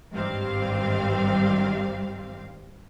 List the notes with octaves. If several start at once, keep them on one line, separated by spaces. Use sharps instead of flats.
G#1 G2 D#3 G3 C4 F5